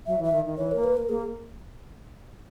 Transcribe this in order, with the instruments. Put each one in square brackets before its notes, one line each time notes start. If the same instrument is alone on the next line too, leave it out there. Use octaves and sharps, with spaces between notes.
[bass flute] F#3 [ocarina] E5
[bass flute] E3
[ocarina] E5
[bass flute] D#3
D#3
[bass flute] E3 [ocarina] C#5
[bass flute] A#3 [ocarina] A#4
[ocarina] B4
A#4
[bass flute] A#3 [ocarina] G#4